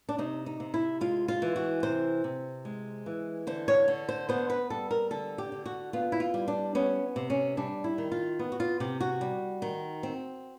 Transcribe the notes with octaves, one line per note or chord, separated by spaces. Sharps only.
D4
C3 D#4
D#4
C3
E4
G#3 F4
F4
E3
F#4
C3 C5
C3
G#3
E3
D3 C5
C#5
D3
C5
B3 C5
B4
G3 A4
A#4
D3 A4
G4
D3
F#4
B3 F4
E4
F4
G3
D4
B3 C#4
C3
C#4
G3 D4
E4
D#3
F4
B3
F#4
F4
C3 G4
F#4
G3
D#3
C4